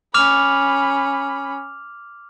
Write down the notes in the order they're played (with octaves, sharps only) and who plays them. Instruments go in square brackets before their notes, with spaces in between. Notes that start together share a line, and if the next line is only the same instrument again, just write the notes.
[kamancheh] C#4 B5 [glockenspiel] D6 F6 F7